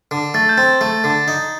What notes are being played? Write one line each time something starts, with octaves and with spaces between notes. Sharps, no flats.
D3
A3 A6
G6
C4 A6
A3
D3
D#4